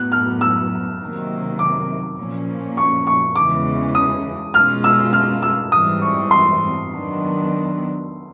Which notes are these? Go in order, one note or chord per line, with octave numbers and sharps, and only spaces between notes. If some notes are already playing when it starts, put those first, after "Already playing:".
Already playing: A2 F#3 B3 F#6
F6
E6
C3 D#3 F#3 A#3
D6
A#2 F3 A#3 C#4
C#6
C#6
E2 C#3 E3 G#3 C#4 D6
D#6
B2 G#3 C#4 F4 F6
E6
F6
E6
G#2 E3 G3 C4 D#6
C#6
C6
D#3 F#3 B3 D4